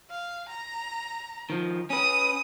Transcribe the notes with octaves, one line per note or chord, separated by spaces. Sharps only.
F5
A#5
D#3 F3
C#4 B4 D#6